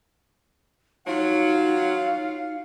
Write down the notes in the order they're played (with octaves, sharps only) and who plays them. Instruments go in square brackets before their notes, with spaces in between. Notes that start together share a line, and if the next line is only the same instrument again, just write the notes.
[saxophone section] F#3 F#4 [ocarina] D#4 [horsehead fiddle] F4 [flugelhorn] F5